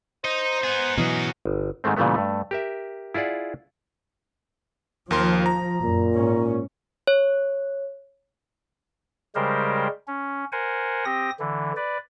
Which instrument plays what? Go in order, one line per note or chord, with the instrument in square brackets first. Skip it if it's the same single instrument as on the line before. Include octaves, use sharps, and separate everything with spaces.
[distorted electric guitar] D#4 [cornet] C5 [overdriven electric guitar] D#5
[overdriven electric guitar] B3 [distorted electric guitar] D#4 G#4
[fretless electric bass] B2 E3 F#3 [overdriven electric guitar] C#4 F#4 [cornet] D#5
[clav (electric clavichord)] G1
G#2 D#3 G#3 A3 C4
A#2 C#3 E3 G3 A3 B3
G2 A3
G4 A#4 E5
E4 F4 G#4 D5 F#5
[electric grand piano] D#2 A#4 C6 [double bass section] F3
[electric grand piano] A#5
[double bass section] F#2 [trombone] A#2
[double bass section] G#2 C#4
[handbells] C#5
[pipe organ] C#3 G3 G#3 G4 A#4 C5
C#4
A#4 C5 F#5 G#5
C4 G4 D#6 A#6
D3 E3
B4 D5